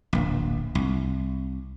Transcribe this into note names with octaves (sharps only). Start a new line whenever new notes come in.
D1 A#1
C2